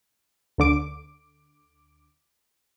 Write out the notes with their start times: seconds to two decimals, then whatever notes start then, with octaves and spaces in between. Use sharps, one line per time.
0.58 D2 D3 D6 D7